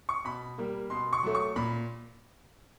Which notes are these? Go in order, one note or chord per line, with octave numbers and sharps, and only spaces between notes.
C#6
B2 B5
G3 A#3
B2 C6
C#6
F#3 A3
C#6
A#2 B5